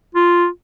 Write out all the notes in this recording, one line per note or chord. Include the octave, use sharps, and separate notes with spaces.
F4